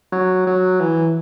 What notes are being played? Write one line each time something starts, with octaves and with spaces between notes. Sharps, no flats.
F#3
F#3
E3